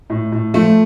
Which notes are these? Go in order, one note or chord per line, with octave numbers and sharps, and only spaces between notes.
A2
A2
F3 A3